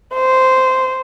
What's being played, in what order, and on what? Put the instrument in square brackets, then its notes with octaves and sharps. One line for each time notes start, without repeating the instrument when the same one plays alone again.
[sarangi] C5